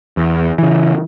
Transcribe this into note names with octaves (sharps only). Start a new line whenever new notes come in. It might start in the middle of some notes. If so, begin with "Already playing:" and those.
E2
C#3 E3